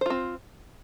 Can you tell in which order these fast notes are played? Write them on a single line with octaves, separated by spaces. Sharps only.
C5 F4 C4